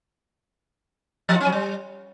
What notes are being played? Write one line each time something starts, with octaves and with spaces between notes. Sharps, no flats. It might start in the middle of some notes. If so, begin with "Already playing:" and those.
F3
F4
C#4
F#3
G3